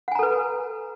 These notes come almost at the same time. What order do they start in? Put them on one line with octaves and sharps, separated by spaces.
F#5 G#5 A#5 A4 B4